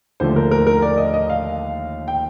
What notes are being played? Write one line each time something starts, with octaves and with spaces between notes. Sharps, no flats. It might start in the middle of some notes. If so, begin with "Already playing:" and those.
D#2 D3 F3 A3 C5
A#4
A#4
A#4
D5
D#5
D#5
F5
G5